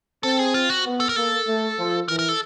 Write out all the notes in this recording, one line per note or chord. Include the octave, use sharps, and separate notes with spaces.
C4 A4
G#4
F4
F#4
B3
A4
A#4
A#3 A4
A3
F3
E3 A#4
A#4
A4